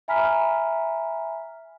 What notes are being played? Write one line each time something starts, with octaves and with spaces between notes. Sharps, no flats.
E5 G#5 A#5 B5 F6 B6